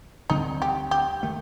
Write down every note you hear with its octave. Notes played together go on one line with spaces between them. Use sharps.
D2 D3 G3 C4 D#4
G4
G4
D#3 A3